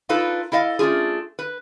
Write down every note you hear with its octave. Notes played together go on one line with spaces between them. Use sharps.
D4 D#4 F4 A4 B4
E4 A4 D#5 F5
A3 C#4 D4 F4 G#4
B4